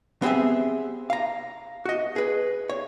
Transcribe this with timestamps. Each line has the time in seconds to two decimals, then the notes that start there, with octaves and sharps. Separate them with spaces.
0.22 B3 C4 G4 G#4 E5
1.10 F5 A#5
1.85 F#4 D#5
2.16 G#4 B4
2.70 C#5